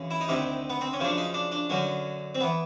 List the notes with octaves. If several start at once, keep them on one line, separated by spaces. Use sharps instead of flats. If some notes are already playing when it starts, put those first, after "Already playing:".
Already playing: F#2 C#3 E3
E4
D#4
D2 C3 D#3 E4
B3
C4
C#4
F#2 C#3 F3 D4
D#4
D4
D4
F#2 D3 F#3 C#4
C4
E3 B3